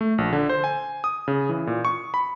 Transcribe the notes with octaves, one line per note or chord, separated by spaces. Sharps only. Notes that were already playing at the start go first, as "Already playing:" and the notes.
A3
A#1
D3
C5
G#5
D#6
C#3
E3
A#2
C#6
B5